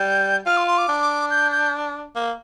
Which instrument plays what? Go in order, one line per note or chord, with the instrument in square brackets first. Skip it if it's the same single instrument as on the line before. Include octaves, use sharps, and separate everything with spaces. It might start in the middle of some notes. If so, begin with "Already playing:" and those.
Already playing: [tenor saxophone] G3 [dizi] G6
[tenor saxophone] F4 [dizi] F6
[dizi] C6
C6
D6
[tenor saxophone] D4
[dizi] G6
G6
[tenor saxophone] A#3